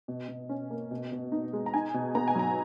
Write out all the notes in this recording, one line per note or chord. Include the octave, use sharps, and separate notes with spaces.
B2
B2
C#4
A#3
B2
B2
D#4
G#3
A#5
D#4 G#5
B2
B3 A#5
G#5
F#3 A#5